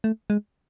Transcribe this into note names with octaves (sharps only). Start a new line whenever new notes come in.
A3
G#3